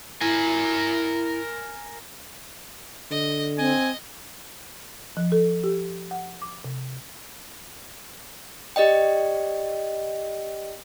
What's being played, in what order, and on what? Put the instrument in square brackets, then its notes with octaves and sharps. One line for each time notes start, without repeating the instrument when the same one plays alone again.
[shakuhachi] E4 [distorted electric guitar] A#4 G#5
[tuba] D3 [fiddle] D#5
[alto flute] C4 [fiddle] D#5 [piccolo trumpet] G#5
[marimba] F3
A4
G4
F#5
D6
C3
[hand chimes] G4 D5 D#5 G5